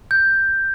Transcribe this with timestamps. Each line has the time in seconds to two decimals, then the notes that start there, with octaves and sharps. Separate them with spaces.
0.11 G6